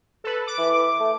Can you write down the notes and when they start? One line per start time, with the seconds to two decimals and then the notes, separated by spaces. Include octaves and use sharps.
0.24 A4 B4
0.47 D6
0.58 E3
1.00 A3